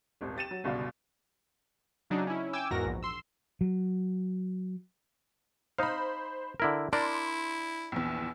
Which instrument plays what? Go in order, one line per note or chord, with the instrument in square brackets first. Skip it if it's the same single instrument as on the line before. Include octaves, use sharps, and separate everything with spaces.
[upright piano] D#1 G#1
G4 A6 D#7 E7
F#3
G1 C#2 B2 F#4 D5 F5
[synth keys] C#3 F#3 D4 D#4
C#4 E4
G5 G#5 D6 E6
E2 G#2 F#4 A#4 A#6
A#1
C6 E6
[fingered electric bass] F#3
[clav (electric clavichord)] D#4 F5 [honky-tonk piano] C5 B5
[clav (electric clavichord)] D3 E4 A#4
[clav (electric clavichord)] D4 A#4 D5 [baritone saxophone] E4 [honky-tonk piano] C6
[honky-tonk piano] A#1 E2